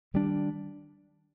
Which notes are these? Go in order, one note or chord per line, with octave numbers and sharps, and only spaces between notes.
D#3 G3 D4